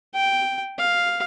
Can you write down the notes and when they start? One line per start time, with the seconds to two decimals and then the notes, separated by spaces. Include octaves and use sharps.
0.14 G5
0.78 F5